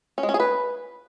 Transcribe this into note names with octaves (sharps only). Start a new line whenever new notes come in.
C#4
G#3
C#4
G#4
B4